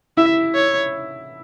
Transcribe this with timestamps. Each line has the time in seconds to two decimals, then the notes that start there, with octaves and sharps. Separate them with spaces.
0.17 E4 E5
0.55 C#5